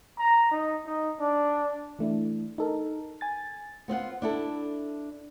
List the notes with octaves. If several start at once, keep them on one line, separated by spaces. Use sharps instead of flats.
A#5
D#4
D#4
D4
E3 A3 D4 E4
D#4 A4 A#4
G#5 A6
B3 C4 F4 F#5
D4 E4 A4